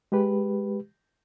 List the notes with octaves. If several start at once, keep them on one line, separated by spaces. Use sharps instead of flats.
G#3 G4 B4